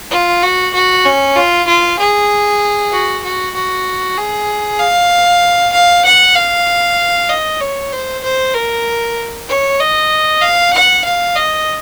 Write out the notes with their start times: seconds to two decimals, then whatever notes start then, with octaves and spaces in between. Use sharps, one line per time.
0.11 F4
0.43 F#4
0.74 F#4
1.05 C#4
1.36 F4
1.67 F4
1.99 G#4
2.92 F#4
3.24 F#4
3.55 F#4
4.17 G#4
4.79 F5
5.73 F5
6.05 F#5
6.36 F5
7.29 D#5
7.60 C#5
7.92 C5
8.23 C5
8.54 A#4
9.48 C#5
9.79 D#5
10.42 F5
10.73 F#5
11.05 F5
11.35 D#5